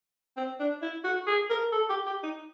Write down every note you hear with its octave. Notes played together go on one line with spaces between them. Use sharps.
C4
D4
E4
F#4
G#4
A#4
A4
G4
G4
D#4